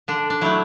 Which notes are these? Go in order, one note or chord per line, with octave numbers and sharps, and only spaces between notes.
D3 D4
D4
F#3 A3 E4